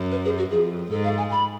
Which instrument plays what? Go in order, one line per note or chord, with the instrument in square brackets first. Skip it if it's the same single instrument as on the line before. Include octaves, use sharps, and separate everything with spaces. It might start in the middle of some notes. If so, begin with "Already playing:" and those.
Already playing: [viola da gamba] F#2
[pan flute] B4
G#4
F#4
[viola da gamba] F2 [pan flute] G#4
[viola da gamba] G#2 [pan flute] A4
[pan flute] F5
G#5
B5